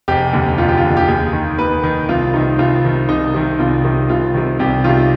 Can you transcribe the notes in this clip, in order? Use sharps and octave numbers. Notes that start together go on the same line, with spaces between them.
F1 G4
D#2 D3
F1 F4
G4
F4
D#2 D3
G4
D#2 G#4
D#3
D#2 B4
D#3
C2 F4
C3 D#3 D#4
C2 F4
C3 D#3
C2 D#4
C3 D#3
C2 F4
C3 D#3
C2 F4
C3 D#3
C2 G4
C3 D#3 F4